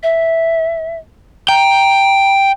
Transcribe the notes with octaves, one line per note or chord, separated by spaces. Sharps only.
E5
G5 A#5